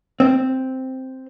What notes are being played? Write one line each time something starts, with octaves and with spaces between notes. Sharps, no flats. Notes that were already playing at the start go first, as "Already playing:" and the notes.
C4